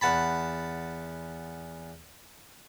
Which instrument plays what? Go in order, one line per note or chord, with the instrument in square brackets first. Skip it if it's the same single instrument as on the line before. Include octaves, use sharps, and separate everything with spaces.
[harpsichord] E2 F#5 A5 B5